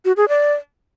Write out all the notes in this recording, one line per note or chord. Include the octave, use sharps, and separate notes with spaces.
F#4
G#4
D5